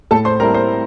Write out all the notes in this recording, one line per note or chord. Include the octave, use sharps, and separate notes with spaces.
A2 A4 A5
C5 C6
G3 C4 E4 A#4 A#5
C5 C6